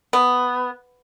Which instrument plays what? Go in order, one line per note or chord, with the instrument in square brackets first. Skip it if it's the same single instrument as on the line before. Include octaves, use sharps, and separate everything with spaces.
[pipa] B3